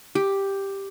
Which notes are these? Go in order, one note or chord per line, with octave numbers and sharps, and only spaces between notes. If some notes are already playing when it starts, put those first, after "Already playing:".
G4